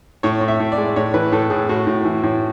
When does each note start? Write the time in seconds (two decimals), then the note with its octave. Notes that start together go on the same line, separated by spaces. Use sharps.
0.23 A2 C#5
0.41 A2
0.48 E5
0.60 A2
0.72 D5
0.78 G#3
0.96 A2 C#5
1.14 E3 B4
1.32 A2 A4
1.50 A2 G#4
1.69 A2 F#4
1.87 A2
2.05 E3
2.23 A2